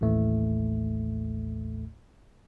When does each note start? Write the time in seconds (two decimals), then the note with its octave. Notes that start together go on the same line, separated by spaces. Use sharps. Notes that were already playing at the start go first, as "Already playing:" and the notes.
0.01 A1 D#2 A2 A3